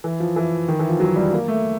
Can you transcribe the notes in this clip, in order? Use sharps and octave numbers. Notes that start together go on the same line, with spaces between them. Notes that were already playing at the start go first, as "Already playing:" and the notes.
E3
F3
E3
D#3
E3
F3
F#3
G3
A#3
A3